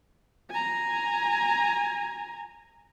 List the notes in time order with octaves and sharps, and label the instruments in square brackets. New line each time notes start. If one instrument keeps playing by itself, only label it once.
[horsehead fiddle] G#5 A#5